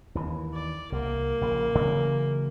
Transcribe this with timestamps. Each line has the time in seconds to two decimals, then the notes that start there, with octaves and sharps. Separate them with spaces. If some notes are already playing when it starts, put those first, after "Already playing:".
0.15 D#2 E3
0.54 D5
0.92 C2 A#3
1.41 A#1 C#3
1.75 C#3 E3 F#3